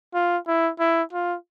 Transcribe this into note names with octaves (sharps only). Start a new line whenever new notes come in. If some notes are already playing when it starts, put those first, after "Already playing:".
F4
E4
E4
F4